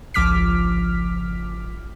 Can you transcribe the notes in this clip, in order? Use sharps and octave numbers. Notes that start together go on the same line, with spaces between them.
G#1 C#2 F3 D6 F6 B6